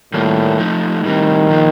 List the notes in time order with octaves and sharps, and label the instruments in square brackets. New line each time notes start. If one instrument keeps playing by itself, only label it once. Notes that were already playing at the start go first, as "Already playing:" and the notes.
[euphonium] A2 [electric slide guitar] D#3 G3 A#3 F4 A#4
[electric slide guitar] F3 A3 D#4
[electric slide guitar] A2 G3 C4 [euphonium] D#3
[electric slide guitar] A#2 F3 A#3